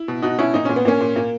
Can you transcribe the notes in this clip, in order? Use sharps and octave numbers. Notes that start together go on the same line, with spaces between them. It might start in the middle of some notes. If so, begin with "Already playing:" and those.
Already playing: E4
B2
B2 D#4 F#4
B2 C#4 E4
A#2 D#4
A#2 C#4
B3
A#2 A#3 C#4
A#2
A#2 A#3